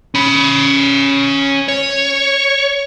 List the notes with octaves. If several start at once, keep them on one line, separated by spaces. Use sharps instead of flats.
C#4 B5
C#5